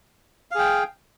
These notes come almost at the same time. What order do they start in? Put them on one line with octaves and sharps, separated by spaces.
F5 G#4 G5